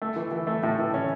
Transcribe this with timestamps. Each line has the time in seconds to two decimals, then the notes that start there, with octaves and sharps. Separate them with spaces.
0.02 A3
0.16 E3
0.32 E3
0.47 A3
0.63 A2
0.79 E3
0.94 C#4